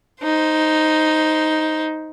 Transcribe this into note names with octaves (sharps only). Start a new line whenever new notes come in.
D#4 C5